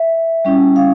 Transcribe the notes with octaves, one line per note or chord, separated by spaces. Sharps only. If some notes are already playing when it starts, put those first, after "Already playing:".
Already playing: E5
G3 C#4 E4
F5